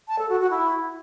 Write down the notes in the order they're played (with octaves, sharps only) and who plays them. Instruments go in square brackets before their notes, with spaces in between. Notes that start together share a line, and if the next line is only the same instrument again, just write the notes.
[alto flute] A5
A4
F#4
F#4
E4